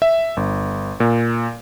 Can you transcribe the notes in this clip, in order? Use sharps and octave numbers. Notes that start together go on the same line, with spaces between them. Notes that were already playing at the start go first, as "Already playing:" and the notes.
E5
G1
A#2